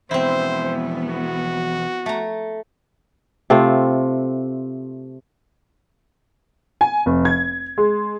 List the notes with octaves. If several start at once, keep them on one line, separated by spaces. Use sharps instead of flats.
E2 B2 F3 B3 C4 E4 C5
F#4
A3 A#5
C3 A3 C4 F4
G#5
F1
G#6
G#3